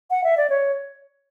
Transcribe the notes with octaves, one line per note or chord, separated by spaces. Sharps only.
F#5
E5
D5
C#5